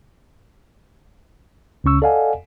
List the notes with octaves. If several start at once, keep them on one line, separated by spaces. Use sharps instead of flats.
C#2 C#3 C#4 C#6 E6
A4 D5 D#5 F5 F#5 G#5